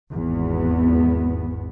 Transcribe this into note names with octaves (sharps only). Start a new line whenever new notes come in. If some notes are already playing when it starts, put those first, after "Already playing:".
G#1 E2 B3